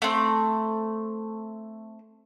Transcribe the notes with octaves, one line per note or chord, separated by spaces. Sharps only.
A3 C4